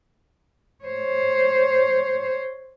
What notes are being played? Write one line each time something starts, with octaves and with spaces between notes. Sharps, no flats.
C5 C#5